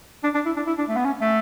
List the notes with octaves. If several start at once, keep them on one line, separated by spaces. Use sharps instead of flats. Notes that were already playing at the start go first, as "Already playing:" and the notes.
D4
D4
E4
D4
E4
D4
A3
B3
C#4
A3